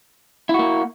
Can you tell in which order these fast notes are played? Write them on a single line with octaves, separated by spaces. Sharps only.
E4 F#4 A#3